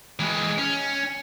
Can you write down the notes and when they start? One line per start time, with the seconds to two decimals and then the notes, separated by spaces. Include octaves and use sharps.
0.20 E3 G#3
0.58 C#4